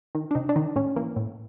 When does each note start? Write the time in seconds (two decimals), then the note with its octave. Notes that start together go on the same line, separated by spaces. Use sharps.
0.15 D#3
0.31 D4
0.35 C3 D#4
0.49 D4
0.56 D#3 D#4
0.76 A2 C#4
0.96 E3 A#3
1.16 A2